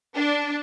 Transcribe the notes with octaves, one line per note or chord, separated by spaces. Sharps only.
D4